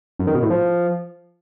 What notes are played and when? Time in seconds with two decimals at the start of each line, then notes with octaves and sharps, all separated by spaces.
0.19 F#2
0.27 D#3
0.35 B2
0.43 A2
0.50 F3